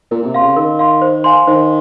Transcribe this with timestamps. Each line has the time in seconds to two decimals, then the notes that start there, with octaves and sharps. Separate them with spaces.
0.11 A#2 A#4
0.22 A#2
0.27 C3
0.34 F5 C6
0.41 C#3
0.56 D#3 A#4
0.79 F5 C6
1.02 C5
1.24 F5 G#5 C6
1.47 D#3 C5